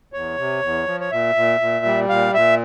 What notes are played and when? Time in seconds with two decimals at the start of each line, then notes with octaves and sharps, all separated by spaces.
0.13 E2 C#5
0.37 C3
0.62 E2
0.86 F3
1.00 C#5
1.11 A#2 E5
1.35 A#2
1.60 A#2
1.85 G3
2.09 A#2 F5
2.34 A#2 E5